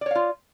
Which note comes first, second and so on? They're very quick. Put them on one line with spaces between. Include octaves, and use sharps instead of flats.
D5 C#5 F5 F4